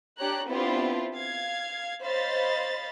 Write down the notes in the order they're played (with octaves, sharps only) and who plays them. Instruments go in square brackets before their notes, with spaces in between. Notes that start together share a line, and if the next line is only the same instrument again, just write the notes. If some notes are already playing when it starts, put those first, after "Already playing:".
[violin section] D4 G4 C#5 A#5 F#6
B3 C4 D4 E4 F4 G4
F5 G#6
C5 C#5 D#5 F5 B5 A6